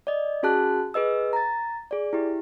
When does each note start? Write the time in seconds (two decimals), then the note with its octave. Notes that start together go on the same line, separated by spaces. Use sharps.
0.07 D5 D#5
0.43 C#4 F#4 G#4 A5 F#6
0.94 G#4 B4 D#5 E6
1.33 A#5 A6
1.91 G#4 D5
2.13 E4 G4